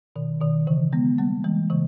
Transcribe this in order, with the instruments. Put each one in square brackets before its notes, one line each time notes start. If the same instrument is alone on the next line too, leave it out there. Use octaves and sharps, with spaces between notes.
[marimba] B2 D#3
B2 D#3
C#3 E3
G#3 B3
G3 A#3
E3 G#3
C#3 E3